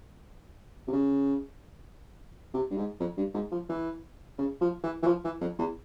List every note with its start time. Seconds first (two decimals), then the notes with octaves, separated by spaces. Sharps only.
0.87 C3
0.93 C#3
2.54 C3
2.70 G2
2.77 G#2
3.00 F2
3.17 G2
3.34 G#2
3.52 F3
3.69 E3
4.38 C#3
4.61 F3
4.83 E3
5.02 E3
5.07 F3
5.24 E3
5.41 F2
5.58 E2